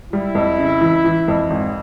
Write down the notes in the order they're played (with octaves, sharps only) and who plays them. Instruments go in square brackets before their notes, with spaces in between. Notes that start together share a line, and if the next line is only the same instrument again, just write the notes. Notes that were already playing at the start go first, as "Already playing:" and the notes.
[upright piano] G3 [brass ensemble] E4
[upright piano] F2
C#3
E3
E3
F2
G#1